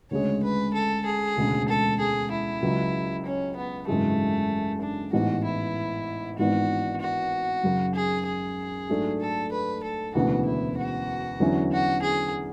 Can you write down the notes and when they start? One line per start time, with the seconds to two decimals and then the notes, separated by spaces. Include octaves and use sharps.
0.11 D2 C#3 G#3 C#5
0.43 B4
0.74 A4
1.05 G#4
1.37 E1 D2 C#3 G#3
1.68 A4
1.99 G#4
2.31 E4
2.62 C#2 C#3 F#3
3.25 C#4
3.56 B3
3.87 G#1 F#2 C#3 E3 G#3 A3
4.81 D4
5.13 A1 G#2 E3 B3 F#4
5.44 E4
6.38 G#1 G#2 E3 B3 D4 F#4
7.01 F#4
7.63 F#2 C#3 F#3
7.95 G#4
8.26 G#4
8.89 G#2 F#3 A3 D4
9.20 A4
9.52 B4
9.83 A4
10.15 E1 D2 C#3 E3 B3 F#4
10.45 E4
10.78 F#4
11.40 E2 D3 F#3 C#4 E4
11.71 F#4
12.02 G#4